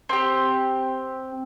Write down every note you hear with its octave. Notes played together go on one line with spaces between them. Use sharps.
C4 G4